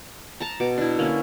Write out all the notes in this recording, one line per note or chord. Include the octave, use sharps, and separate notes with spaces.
A5 A#5
B2 D6
D4 E4
D3 A#3 C#4